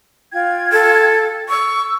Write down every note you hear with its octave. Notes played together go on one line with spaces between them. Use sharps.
F4 G5 G#6
A4
C#6 E6